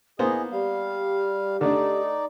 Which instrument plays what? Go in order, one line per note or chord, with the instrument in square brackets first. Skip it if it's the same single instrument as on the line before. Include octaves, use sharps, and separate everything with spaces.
[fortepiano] A#3 B3 C5 [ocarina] E4 [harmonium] G#4 D#5
[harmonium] G3 F5 [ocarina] G4
[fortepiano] D3 A3 D4 [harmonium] D#4 D5